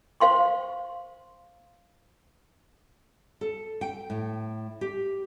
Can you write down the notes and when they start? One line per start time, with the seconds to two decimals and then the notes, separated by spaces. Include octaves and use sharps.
0.20 C5 F5 C6 C#6
3.41 A4
3.81 G5
4.10 A2
4.81 G4